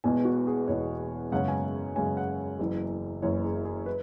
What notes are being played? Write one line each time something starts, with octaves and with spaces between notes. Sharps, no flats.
E1 E2 B2 G#5
F#4
G#4
E1 E2 B2 C#5
F#2 C#3 G#3 C#4 F#5
G#5
F#2 C#3 G#3 C#4 G#5
F#5
F#1 F#2 E3
F#1 F#2 E3 C#5
G#4
G#4
B4